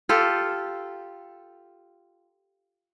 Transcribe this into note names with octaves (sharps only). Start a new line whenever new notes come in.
F4 G4 A4